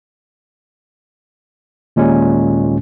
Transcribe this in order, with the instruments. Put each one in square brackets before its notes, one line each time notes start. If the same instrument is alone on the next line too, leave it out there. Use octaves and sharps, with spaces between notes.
[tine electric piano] D#2 A#2 G#3 C#4